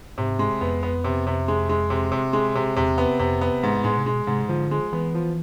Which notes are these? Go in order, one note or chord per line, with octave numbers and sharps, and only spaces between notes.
G#2 C3
G#3
F2 B3
B3
C3
C3
G#3
G#3
C3
C3
G#3
C3
E2 C3
B3
F2 C3
B3
G#2
A2 G#3
C3
B2 G#3
G#2 C3
D3 F3
G#3
E3 B3
F3